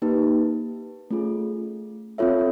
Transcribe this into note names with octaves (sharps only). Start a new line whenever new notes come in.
A#3 D#4 G4 B4
A3 C#4 F4 G#4
C4 F4 A4 C#5 E5